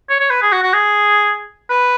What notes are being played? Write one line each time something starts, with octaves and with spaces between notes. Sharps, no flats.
C#5
C#5
B4
G#4
F#4
F#4
G#4
B4